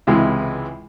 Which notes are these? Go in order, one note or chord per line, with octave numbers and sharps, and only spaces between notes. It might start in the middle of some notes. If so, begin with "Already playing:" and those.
C#2 C3 E3 G#3